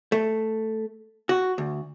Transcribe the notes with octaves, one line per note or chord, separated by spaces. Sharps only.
A3
F#4
D2